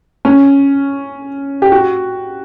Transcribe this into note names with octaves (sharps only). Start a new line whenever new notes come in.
C#4
G4
F#4